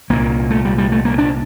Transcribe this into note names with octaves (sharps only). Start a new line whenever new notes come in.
C2 A#2 A#3
A3
G3
G3
A3
A#3
D4